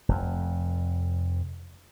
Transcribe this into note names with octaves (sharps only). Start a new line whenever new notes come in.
F1 F2